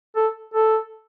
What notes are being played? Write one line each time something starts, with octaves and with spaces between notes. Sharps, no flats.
A4
A4